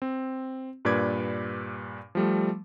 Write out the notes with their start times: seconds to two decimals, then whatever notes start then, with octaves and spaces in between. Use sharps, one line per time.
0.02 C4
0.85 G2 A#2 B4 D5 D6 G#6
2.15 F3 G3 A3